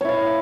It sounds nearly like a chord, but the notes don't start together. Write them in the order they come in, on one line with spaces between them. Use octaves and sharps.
C#5 E4 F5